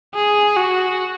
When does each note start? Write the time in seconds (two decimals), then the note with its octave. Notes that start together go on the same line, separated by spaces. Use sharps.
0.15 G#4
0.56 F#4